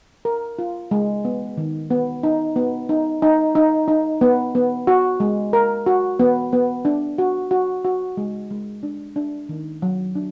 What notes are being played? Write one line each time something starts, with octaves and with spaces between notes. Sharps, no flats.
A#4
F4
G#3
B3
D#3
B3
D#4
B3
D#4
D#4
D#4
D#4
B3
B3
F#4
G#3
A#4
F#4
B3
B3
D4
F#4
F#4
F#4
G#3
G#3
D4
D4
D#3
F#3
D4